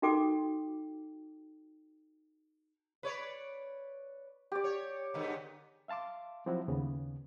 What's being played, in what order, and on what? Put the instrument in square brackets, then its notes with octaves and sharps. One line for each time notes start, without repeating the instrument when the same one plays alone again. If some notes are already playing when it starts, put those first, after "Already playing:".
[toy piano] D#4 F#4 A4 G5 D6
[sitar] B4 C#5 D5
[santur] G4 D5
[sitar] C#5
G#2 D3 B3
[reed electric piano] E5 F5 A5 C6 D6
F3 F#3 C4 E4 F#4
D#2 C#3 B3